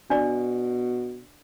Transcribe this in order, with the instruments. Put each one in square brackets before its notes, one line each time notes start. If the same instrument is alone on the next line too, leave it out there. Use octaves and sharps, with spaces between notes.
[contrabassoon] B2 [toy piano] D4 D5